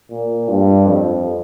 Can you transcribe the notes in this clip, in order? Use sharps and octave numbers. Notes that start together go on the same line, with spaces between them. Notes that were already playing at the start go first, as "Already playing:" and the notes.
A#2
G2
F2